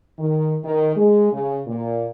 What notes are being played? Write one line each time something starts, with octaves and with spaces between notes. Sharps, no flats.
D#3
D#3
G#3
C#3
A#2